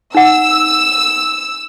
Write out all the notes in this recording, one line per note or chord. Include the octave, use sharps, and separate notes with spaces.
D#4 F#5 E6